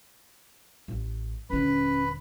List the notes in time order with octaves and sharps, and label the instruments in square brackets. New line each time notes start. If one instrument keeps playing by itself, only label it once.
[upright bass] A1
[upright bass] D#1 D3 [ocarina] C#4 [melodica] B4 B5